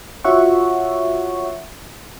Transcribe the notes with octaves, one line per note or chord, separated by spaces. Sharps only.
F4 F#4 C#5 E5 F#5 C#6